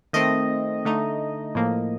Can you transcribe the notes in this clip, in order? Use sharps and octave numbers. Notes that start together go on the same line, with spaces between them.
D#3 A3 C4 D#5
D3 A3 D#4
A2 F3 A#3